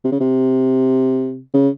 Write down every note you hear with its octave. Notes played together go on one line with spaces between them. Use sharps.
C3
C#3
C3
C#3